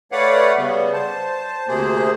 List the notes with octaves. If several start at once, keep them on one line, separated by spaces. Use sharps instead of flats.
A3 B4 C#5 D5 F5 F#5
C#3 G3 B3
C5 A5
D2 C3 A#3 G#4 C5